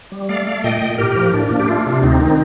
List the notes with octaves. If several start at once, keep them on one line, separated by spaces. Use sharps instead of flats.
G3
A3 D5 F5
A3
A#2 D#5 G5
A#2
A2 G4 A#4
F3
A2 D4
A#3
G4
A3 D4 F4
C3
D2 C4 D#4
D#3